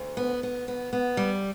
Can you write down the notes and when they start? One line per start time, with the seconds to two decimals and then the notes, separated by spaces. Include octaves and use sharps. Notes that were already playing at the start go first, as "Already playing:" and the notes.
Already playing: D2
0.17 B3
0.43 B3
0.68 B3
0.93 B3
1.17 G3